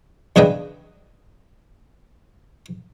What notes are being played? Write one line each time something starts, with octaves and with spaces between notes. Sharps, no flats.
E2 C#3 D4 B4 D#5 G5